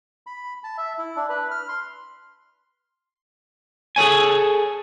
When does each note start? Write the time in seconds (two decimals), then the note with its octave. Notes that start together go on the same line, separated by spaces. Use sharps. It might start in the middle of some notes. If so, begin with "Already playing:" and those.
0.27 B5
0.64 A5
0.78 E5
0.98 E4
1.17 D4
1.29 B4
1.51 F6
1.69 C6
3.96 G#4 A4 C#5 G#5